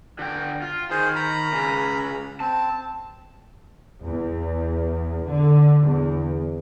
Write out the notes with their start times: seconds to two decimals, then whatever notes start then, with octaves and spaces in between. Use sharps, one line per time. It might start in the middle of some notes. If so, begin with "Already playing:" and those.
0.19 D3 G5
0.62 F4
0.91 D#3 G#4 C5
1.16 A#5 B5
1.52 C#2 C#3
2.40 C4 A5
4.04 E2
5.28 D3
5.83 E2